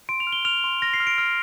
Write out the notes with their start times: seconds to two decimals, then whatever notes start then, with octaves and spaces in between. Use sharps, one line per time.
0.09 C6 D7
0.20 F7
0.27 F6
0.32 G7
0.45 F6 F7
0.64 C6
0.82 F6 A#6
0.94 C7
1.00 F6
1.07 D7
1.18 F6